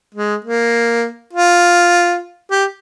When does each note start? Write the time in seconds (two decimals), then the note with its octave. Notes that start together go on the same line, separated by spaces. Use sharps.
0.14 G#3
0.45 A#3
1.33 F4
2.51 G4